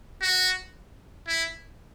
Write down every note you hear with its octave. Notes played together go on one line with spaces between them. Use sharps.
F#4
E4